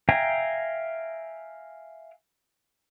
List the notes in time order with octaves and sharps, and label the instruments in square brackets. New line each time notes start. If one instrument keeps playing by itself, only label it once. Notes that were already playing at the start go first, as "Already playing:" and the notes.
[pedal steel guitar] E5 F5 G5 G#5 A#5